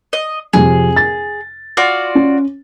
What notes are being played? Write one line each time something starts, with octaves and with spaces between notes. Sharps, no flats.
D#5
F2 C3 G#4
A6
F4 F#4 D5
C#4